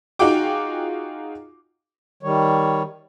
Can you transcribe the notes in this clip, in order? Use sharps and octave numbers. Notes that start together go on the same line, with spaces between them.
D#4 F4 F#4 G#4 G5 D6
D#3 G3 C#5